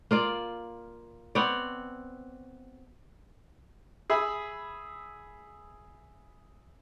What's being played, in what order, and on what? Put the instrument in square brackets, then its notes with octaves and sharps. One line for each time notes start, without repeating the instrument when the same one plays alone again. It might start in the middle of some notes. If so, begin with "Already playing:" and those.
[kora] A#3 F4 D5
B3 C4 C#5 D5
[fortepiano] G#4 E5 B5